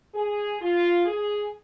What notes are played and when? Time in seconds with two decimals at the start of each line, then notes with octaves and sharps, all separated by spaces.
0.14 G#4
0.60 F4
1.05 G#4